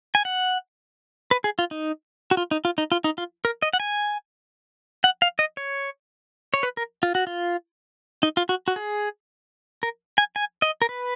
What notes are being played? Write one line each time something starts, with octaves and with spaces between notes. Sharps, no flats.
G#5
F#5
B4
G#4
F4
D#4
F#4
F4
D#4
F4
D#4
F4
D#4
F4
A#4
D#5
F#5
G#5
F#5
F5
D#5
C#5
C#5
B4
A#4
F4
F#4
F4
D#4
F4
F#4
F#4
G#4
A#4
G#5
G#5
D#5
A#4
B4